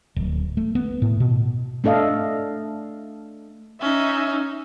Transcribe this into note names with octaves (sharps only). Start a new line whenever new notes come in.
D1
A3
B3
A2
B2
A3 D4 A4 D#5 F5
C#4 D#4 E5